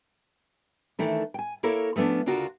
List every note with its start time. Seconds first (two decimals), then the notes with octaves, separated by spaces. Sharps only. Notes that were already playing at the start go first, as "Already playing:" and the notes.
0.99 D#3 E3 A3 D4
1.34 G5 G#5
1.63 A#3 E4 A4 A#4 C#5
1.96 F3 A3 B3 C#4 D4
2.26 D2 C#3 D4 F4 F#4 A#4